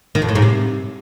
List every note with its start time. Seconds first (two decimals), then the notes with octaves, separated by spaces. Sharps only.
0.15 D#3
0.22 F2
0.29 A2
0.35 G#2
0.42 C3